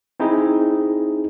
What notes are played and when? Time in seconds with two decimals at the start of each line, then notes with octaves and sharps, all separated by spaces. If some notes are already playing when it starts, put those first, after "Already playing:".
0.20 C4 D#4 E4 G#4